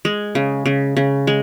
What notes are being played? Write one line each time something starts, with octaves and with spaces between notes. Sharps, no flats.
G#3
C#3
C#3
C#3
G#3